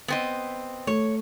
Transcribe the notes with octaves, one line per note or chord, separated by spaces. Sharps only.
B3 C4 D#5
A3 C#5